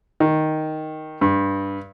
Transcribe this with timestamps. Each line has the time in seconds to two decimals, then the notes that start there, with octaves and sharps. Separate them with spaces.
0.20 D#3
1.21 G2